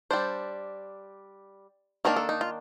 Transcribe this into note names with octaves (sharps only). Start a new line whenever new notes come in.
G3 D4 C5
D#3 A#3 D4 A#4
A4
D#4
F4